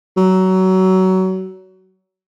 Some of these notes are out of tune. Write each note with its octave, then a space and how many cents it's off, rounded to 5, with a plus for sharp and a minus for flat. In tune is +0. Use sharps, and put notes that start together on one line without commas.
F#3 +20